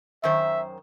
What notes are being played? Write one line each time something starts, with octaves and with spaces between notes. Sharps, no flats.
F#2 D#3 C5 E5